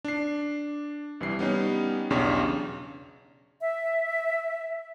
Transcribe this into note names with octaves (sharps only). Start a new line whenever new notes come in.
D4 C7
C2 E3 G3 C7
G3 B3 C#4 D#4
B1 E2 C#3 D4 G4 C#5
E5